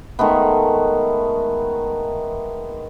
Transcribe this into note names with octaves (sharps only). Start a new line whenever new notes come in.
D#3 G#3 A3 B3